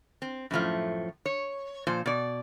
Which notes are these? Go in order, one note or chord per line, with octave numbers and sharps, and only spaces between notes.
C4
F#2 A2 F3 A3
C#5
A#2 F3 C5
B2 D5